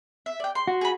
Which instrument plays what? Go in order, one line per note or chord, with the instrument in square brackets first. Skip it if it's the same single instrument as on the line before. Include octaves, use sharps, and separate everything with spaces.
[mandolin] E5
D5 G5
C6
[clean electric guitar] F#4
[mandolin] G#4 B5